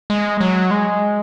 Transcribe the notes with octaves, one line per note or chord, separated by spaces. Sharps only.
G#3
F#3
G#3